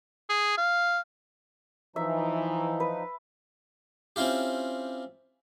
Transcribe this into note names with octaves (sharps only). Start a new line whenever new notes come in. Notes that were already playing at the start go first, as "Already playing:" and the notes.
G#4
F5
E3 F3 D#4 E5
B4
C4 C#4 E4 F4 G4